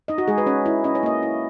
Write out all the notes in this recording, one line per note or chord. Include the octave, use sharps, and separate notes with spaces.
D#4 D#5
F#4
G#3 G#4
B4
C#4 C#5
E4
C#4 D#5
C#5
A#3 D#5
E4